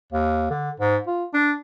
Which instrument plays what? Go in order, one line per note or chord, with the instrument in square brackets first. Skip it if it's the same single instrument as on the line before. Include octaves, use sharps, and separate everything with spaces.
[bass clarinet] D#2
D3
G#2
F4
D4